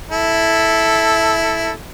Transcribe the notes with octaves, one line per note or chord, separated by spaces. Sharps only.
E4 A4